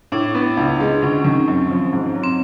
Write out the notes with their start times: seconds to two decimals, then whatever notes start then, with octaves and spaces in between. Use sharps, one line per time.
0.12 A2 D4
0.35 B3
0.57 C#2
0.80 G#3
1.02 D2 C#4
1.24 D#3 C4
1.48 F#2
1.70 F3
1.93 G#2
2.14 F#3
2.23 C4